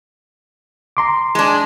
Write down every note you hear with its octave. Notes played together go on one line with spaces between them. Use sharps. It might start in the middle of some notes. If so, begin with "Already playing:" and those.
A#5 C6 D6
G#3 D4